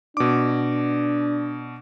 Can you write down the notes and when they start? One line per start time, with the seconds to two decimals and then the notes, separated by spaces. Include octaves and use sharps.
0.17 B2 D4 D6